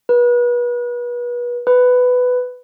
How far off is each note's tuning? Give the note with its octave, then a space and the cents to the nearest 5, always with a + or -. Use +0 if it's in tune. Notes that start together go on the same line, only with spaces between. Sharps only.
B4 -35
B4 +10